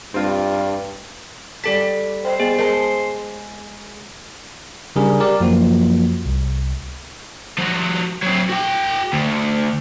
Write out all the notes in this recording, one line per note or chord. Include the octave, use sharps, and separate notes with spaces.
G2 C4 F4
G3 A4 A5 B6
C5 D#5 G5
B3 G#4
G#3 A#4 A5
C#3 G3 D4 G#4 A#4
G4 A#4 D5
F#2 F3 A#3 F#4
C2
F3 F#4
F#3 C4
F#4 G5
D2